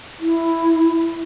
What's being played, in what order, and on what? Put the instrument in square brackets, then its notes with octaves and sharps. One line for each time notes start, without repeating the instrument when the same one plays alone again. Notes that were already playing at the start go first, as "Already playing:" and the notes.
[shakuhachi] E4